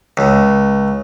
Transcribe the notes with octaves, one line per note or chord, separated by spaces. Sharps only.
C#2